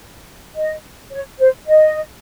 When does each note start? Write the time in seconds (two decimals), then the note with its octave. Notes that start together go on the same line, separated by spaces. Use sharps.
0.56 D#5
1.11 C#5
1.39 C5
1.67 D#5